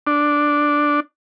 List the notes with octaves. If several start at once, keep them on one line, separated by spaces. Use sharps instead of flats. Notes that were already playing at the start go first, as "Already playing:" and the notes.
D4